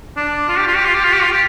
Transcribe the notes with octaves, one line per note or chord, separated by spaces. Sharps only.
D4
F4
G4
F4
G4
F4
G4
F4
G4
F4
G4